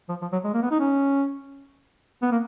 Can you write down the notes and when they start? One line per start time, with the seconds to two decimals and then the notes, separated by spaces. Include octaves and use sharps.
0.09 F3
0.22 F3
0.32 F#3
0.44 G#3
0.53 A#3
0.62 B3
0.71 D#4
0.80 C#4
2.22 B3
2.31 A#3